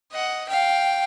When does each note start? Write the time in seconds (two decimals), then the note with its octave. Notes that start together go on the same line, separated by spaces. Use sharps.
0.12 D#5 F#5
0.48 F5 G5